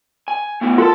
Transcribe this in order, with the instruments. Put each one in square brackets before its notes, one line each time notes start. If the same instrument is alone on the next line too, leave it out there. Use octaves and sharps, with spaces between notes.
[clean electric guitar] G#5
A3 B3 E4
[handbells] F4 A#4 [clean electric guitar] A4 A5